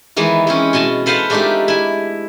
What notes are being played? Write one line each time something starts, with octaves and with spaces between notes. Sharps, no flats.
D#3 E3 G#3 B3
G#3 C4 C#4
B2 D#5 G#5 A5
A4 B4 C5 F5 F#5 A5
G#3 A3 D4 D#4 F4 G4
E4 G#5